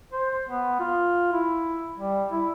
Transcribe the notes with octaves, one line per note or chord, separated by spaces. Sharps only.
C5
B3
F4
E4
G3
E4